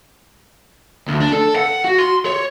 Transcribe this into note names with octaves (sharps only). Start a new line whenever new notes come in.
D2
D4
A4
F#5
F#4
C6
C#5